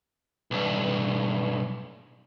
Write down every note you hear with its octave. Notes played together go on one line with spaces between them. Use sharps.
B1 G2